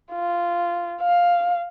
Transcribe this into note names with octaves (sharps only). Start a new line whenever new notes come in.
F4
F5